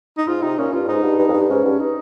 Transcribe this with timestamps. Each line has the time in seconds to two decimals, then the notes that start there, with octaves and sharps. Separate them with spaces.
0.17 D#4
0.27 G#2 F4
0.42 C3 D#4
0.58 A#2 C#4
0.73 G2 F4
0.88 G#2 D#4
1.03 G2
1.19 G2
1.28 F2
1.33 G2
1.49 G#2 C#4
1.64 G2
1.80 D#4